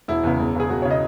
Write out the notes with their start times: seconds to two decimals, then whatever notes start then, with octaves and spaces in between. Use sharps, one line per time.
0.08 E1 E4
0.24 E2 C#3
0.40 E1
0.55 E2 C#3 G#4
0.70 E1 F#4
0.82 C#3 C#5
0.91 D#5